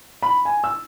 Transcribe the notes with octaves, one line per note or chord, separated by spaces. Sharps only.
B5
G#5
E6